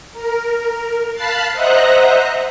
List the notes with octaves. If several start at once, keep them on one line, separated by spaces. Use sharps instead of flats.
A#4
F5 A5 B5 F#6 A6 C7
C5 D#5 E5 F#5 A#5 F#6